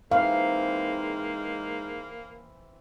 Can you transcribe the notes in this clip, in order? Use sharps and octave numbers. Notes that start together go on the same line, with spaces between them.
E3 G#3 A#3 C4 D#4 F5